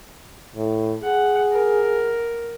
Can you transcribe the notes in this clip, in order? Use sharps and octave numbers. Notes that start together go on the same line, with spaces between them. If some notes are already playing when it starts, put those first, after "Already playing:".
A2
G#4 F#5
A#4